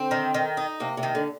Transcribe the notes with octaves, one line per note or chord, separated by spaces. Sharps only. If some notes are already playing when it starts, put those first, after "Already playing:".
Already playing: D3 C4
D#3
D#3
D#4
C3 A#3
C3
D#3
D3